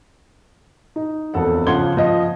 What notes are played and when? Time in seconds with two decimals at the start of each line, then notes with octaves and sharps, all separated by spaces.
0.96 D#4
1.34 E1 F2 A4 F#5
1.67 C#3 F3 F#5 C6 G#6 G7
1.97 F3 D#5